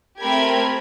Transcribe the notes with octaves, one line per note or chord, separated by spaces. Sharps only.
A3 C4 G4 A#4 B5 G#6